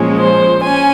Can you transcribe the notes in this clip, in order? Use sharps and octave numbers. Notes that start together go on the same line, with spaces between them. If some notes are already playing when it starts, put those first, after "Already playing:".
Already playing: A#2 F3 G#3 C#4
C5
C#4 G#5